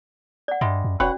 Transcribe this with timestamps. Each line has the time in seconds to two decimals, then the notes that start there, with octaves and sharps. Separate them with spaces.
0.48 D5 F#5
0.61 G2 G3 G#3 E5
0.84 F#2
1.00 E1 C#4 F#4 B4 C#5 D5 F#5